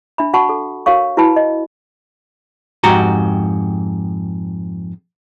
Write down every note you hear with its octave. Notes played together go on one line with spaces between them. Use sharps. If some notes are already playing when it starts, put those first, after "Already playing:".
D4 E5 B5
F#4 F#5 A5 B5 C#6
A4
F#4 A#4 C#5 F5 C#6
E4 F#4 B4 A5 B5
D#5
F2 G#2 F#4 G4 A#5